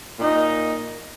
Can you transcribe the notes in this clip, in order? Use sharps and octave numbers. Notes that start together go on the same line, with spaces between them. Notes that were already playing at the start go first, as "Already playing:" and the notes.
A#2 A#3 D#4